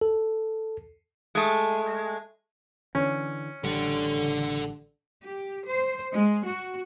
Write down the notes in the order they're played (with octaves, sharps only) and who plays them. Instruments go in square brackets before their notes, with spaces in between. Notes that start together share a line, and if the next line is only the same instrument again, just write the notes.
[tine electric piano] A4
[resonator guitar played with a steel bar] G#3 A3
[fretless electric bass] D3 E3 [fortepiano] C#4
[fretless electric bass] A1 G3 [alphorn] D3 [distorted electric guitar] A4 F#5
[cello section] G4
C5
G#3
F#4